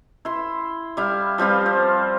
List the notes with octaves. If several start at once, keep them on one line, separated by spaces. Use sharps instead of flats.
E4 C6
G3 E4 F5
F3 G3 C4 F4
C4